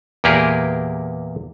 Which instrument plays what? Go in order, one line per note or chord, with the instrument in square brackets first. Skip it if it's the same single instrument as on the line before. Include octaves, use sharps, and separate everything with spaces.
[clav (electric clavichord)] E2 A#2 A#3 G4 G#4 A#4